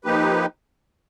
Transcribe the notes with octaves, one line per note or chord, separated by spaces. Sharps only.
F3 A#3 D#4 G4 B4